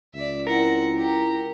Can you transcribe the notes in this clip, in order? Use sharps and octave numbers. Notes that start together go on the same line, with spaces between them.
C#2 D5 E5
C4 E4 A#4 F#5
G4 A#5